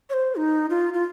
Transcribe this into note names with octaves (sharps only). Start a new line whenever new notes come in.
C#5
C5
D#4
F4
F4